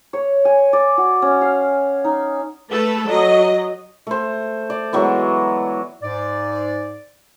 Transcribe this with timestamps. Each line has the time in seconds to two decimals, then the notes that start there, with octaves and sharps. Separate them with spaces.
0.13 C#5
0.45 G#5
0.73 D5
0.98 F#4
1.22 C#4
1.41 F5
2.04 D#4
2.71 A3 A4 B4
3.07 F#3 D#5
4.07 A3 C5
4.70 D5
4.93 E3 F#3 G#3 B3
6.03 G#2 D5